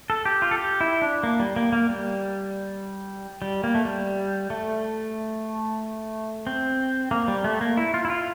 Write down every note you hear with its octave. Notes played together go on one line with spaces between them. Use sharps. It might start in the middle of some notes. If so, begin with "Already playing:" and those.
A4
G4
F4
A4
G4
E4
D4
A#3
G3
A#3
A#3
G3
G3
A#3
A3
G3
A3
C4
A#3
G3
A3
A#3
E4
F4
E4
F4